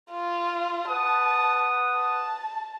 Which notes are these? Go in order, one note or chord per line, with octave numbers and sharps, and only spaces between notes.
F4
B4 F#5 A5 D#6
A5